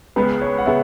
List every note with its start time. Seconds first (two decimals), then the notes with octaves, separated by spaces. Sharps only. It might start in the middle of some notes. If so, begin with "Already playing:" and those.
0.16 C#2 C#3 G#3 B3 B4
0.42 C#5
0.58 F#5
0.66 C#3 G#3 B3 E5